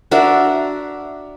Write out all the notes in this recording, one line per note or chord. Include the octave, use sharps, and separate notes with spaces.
D4 F#4 A#4 E5